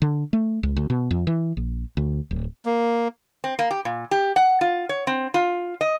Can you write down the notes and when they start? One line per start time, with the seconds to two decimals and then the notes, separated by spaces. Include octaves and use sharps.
0.02 D3
0.33 A3
0.63 C#2
0.76 D2
0.90 B2
1.11 F2
1.27 E3
1.57 A#1
1.97 D2
2.31 D1
2.65 A#3
3.44 C4
3.59 A#3
3.71 G4
3.85 A#2
4.11 G4
4.36 F#5
4.61 F4
4.89 C#5
5.07 C4
5.34 F4
5.81 D#5